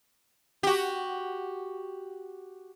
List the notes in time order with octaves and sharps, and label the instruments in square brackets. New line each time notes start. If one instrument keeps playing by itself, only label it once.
[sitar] F#4 G4